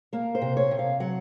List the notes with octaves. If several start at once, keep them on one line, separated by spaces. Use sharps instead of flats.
A#3 A#4
C5
C3
C#5
C3
F5
F#3 F#5